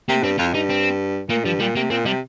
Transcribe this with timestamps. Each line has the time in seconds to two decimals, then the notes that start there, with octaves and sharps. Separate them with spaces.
0.09 C3 A#3
0.23 G2 C4
0.38 F2 F4
0.54 G2 D#4
0.70 C4
1.29 A#2 A#3
1.45 G2 F3
1.59 A#2 G3
1.76 C3 A#3
1.90 A#2 C4
2.05 C3 G3